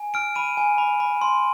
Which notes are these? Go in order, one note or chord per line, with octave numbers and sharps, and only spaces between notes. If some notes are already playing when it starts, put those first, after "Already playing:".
Already playing: G#5
F6 D7
B5 D#7
G#5
B5
B5
C6